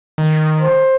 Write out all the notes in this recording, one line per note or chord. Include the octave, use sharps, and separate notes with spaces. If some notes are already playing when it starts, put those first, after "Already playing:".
D#3
C5